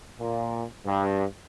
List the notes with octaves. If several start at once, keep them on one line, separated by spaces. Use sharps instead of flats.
A#2
G2